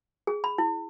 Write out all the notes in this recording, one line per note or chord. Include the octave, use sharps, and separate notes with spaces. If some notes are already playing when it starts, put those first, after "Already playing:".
G#4
B5
E4